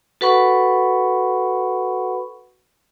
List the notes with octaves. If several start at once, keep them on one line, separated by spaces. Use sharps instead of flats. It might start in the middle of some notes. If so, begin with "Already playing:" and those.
F#4 A4 B4 F#5 B5 C#6